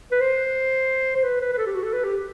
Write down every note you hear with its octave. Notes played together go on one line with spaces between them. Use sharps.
B4
C5
C5
B4
B4
B4
A4
G4
F#4
A4
B4
G4